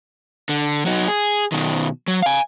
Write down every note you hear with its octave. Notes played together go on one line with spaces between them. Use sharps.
D3
F#3 D#4
G#4
B2 D#3
F#3
F5 G#5